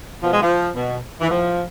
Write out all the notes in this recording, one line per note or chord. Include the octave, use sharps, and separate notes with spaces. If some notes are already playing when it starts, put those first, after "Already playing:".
B2 F3
G#3
F3
B2
E3
A2 F3